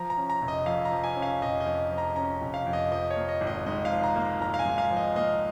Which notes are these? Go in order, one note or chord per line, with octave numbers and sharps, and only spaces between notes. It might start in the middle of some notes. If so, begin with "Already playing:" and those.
Already playing: F3 A#5
A#5
C#4
A#5
F1
D#5
F2 F5
A#5
F3
G#5
C#4
F5
F1 D#5
D#5
F2
F3
A#5
C#4 A#5
F1
F5
F2
D#5
F3 D#5
C#5
A#3
D#5
G#1
D#5
G#2 D#5
F5
F3
A#5
A#3
G#1 A#5
F5
G#5
G#2
F5
F3
D#5
A#3 D#5